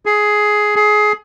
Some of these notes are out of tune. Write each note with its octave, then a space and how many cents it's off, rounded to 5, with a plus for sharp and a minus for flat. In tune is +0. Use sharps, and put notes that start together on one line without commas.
G#4 +10
G#4 +20